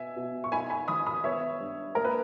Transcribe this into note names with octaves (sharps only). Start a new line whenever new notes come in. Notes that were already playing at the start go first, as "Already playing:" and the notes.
Already playing: B2 B3 E5 G#5
B2
C#6
D#4 G#5 B5
G#5 B5
D#3 B5 D#6
B5 D#6
B3 C#5 E5
G2
A#3 A#4
B4